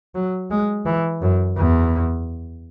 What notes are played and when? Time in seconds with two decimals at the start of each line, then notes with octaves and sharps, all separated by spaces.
0.15 F#3
0.51 G#3
0.86 E3
1.22 F#2
1.57 E2